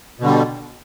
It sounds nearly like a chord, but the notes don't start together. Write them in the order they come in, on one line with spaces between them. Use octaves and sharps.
B2 D3 G3